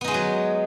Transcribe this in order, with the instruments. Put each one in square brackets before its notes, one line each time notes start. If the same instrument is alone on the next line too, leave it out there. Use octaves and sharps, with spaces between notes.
[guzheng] B3
D#4
G#3
F#4
F#3